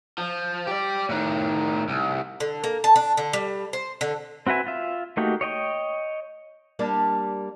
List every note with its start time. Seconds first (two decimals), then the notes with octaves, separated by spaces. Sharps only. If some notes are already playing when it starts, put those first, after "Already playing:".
0.18 F3
0.67 G4 D5
1.09 A2 D#3
1.88 C2
2.40 D3
2.64 A#3
2.84 A5
2.96 D4
3.17 D3
3.33 G3
3.73 C5
4.01 D3
4.47 C4 F#4 B4 E5 G#5
4.67 F4 E5
5.17 A3 A#3 D#4 F#4 G4
5.41 C#5 D#5 G5 C#6
6.79 G3 A#3 D4